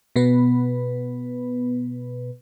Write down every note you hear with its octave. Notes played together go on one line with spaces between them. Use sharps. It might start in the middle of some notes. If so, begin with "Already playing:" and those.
B2 B3 B4